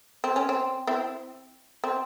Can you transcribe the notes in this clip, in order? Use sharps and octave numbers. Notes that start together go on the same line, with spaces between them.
C4
C#4
C4
C4 E4
C4